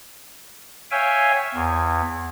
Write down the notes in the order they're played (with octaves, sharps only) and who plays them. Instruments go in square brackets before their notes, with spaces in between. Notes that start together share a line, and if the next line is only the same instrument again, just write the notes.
[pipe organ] C#5 E5 F5 G5 G#5
E2